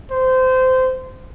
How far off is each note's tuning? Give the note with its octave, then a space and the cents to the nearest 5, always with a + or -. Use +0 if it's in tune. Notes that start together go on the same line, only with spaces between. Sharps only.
C5 -20